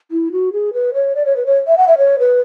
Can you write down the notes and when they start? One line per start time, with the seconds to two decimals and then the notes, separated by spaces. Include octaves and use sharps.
0.11 E4
0.32 F#4
0.53 G#4
0.73 B4
0.94 C#5
1.16 D5
1.26 C#5
1.36 B4
1.46 C#5
1.67 E5
1.78 F#5
1.88 E5
1.98 C#5
2.19 B4